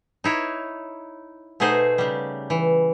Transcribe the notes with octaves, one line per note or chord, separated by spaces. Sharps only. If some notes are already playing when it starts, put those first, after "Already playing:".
D#4 E4 C#5
B2 A3 D#4 G#4 C5
C#3 G3
E3